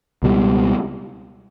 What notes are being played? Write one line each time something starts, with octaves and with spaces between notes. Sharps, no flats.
C#2 B2 G3